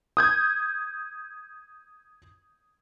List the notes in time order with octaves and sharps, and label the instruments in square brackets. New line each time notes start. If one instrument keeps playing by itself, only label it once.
[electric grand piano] D#6 G6 G#6